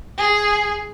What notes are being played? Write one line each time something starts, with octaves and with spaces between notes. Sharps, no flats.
G#4